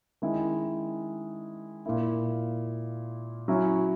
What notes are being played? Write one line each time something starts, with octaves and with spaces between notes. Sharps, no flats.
D#3 G#3 C#4 E4
A#2 A#3 E4
F#3 C#4 E4